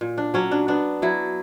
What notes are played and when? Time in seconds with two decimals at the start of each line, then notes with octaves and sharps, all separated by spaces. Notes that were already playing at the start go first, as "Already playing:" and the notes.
0.01 A#2
0.18 D4
0.34 F#3 C#4
0.51 D4
0.68 B3 D4
1.02 F#3 E4